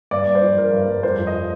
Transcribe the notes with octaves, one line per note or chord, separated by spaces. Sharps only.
G2 D5
G2
C5
F3
F3 A#4
G2
G2
F2 C5
F3
D#5